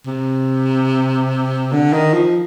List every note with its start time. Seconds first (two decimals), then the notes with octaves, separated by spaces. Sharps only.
0.07 C3
1.72 D3
1.93 D#3
2.13 F3